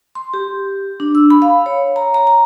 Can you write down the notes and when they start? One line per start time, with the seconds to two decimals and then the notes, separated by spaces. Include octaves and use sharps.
0.15 C6
0.34 G4
1.00 D4
1.15 E6
1.30 B5
1.42 F5
1.66 C#5
1.96 A#5
2.14 A#5
2.27 A#5